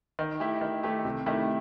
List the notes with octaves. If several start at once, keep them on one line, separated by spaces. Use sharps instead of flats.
D#3
A3 E4 G4
D#3
A3 E4 G4
C3
D#3 A3 E4 G4